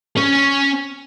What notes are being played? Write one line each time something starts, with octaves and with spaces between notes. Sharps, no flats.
C#4 C#5